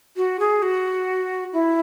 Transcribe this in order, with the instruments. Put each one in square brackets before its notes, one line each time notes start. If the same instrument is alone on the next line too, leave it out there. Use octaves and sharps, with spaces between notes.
[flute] F#4
G#4
F#4
E4